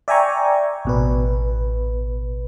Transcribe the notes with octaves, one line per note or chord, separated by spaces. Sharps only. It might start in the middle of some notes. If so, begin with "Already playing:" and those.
D5 E5 G5 G#5 A#5 C#6
A1 B2 B4